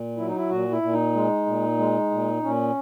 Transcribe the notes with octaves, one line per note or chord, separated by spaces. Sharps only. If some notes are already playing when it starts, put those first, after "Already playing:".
Already playing: A#2
F#3 E4
D#4
E4
A#2 F#4
E4
A#2
D#4
G#3
A#2
G#3
A#2
A#2 C#4